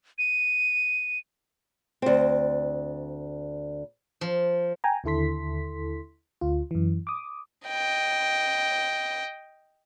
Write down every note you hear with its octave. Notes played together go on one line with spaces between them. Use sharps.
D#7
D2 C4
F3
G5 G#5 A#5
D#2 D3 E4 A4 C6 B6
D2 F4
F#2 E3
D6 D#6
D#5 G5